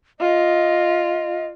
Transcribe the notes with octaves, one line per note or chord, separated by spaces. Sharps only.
F4 D#5